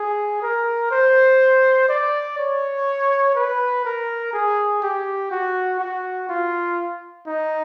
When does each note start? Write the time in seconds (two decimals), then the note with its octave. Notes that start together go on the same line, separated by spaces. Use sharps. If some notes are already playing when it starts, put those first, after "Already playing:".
Already playing: G#4
0.43 A#4
0.91 C5
1.89 D5
2.38 C#5
3.36 B4
3.85 A#4
4.33 G#4
4.82 G4
5.31 F#4
5.80 F#4
6.29 F4
7.27 D#4